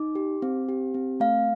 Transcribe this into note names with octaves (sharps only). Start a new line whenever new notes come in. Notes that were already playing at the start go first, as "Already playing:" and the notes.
Already playing: D#4 D6
G4
C4
G4
C4
A3 F5